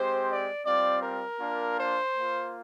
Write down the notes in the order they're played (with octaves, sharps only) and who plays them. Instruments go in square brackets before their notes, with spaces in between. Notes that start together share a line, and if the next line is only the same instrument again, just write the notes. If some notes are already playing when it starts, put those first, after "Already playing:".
Already playing: [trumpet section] G#3 C4 G4 C5
D5
G3 C4 F4 D5
A#4
A#3 D4 F4
C5
A#3 F4